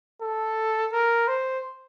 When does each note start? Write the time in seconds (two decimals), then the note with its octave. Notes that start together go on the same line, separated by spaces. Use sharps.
0.21 A4
0.93 A#4
1.28 C5